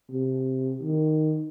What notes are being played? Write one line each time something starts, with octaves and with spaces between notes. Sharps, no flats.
C3
D#3